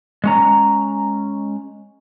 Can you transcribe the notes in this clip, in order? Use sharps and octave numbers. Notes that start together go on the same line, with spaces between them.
G#3 C#4 A#5